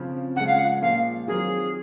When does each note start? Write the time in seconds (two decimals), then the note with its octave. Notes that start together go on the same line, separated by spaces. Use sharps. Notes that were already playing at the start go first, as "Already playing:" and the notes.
Already playing: C#3 F3 C4
0.36 C#3 F3 G#3 F#5
0.47 F5
0.58 F#5
0.82 A#2 F3 G#3 F5
1.28 D#3 F#3 C4 F4 G#4 A#4